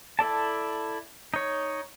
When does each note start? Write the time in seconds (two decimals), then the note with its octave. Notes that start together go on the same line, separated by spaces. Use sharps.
0.19 E4 A4 D5 A5
1.34 D#4 C#5